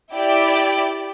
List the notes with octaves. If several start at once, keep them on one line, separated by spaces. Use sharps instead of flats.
E4 G4 D5 G5